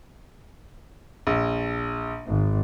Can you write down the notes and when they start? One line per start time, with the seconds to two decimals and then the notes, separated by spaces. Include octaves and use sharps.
1.27 A#1
2.26 G#1